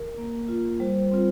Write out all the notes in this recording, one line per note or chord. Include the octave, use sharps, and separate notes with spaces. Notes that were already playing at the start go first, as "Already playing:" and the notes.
Already playing: A#4
A#3
F4
G3 C5
C4 F4